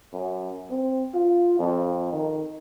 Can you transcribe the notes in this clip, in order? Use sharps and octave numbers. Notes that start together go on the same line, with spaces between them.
F#2
C4
F4
F2
D#3